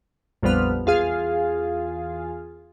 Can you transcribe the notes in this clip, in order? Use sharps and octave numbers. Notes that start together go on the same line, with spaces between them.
A#1 F2 F3 G3 B3 F6
E2 F4 G#4 F5